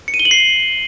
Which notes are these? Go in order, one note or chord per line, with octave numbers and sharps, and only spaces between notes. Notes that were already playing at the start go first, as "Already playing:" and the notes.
C#7
D#7
G7
F#7
C7